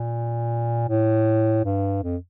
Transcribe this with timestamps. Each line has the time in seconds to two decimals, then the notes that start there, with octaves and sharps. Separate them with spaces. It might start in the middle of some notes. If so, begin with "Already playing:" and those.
Already playing: A#2
0.89 A2
1.65 G2
2.03 F2